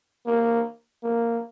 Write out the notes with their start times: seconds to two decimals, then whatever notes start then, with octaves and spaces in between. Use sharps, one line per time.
0.26 A#3
1.03 A#3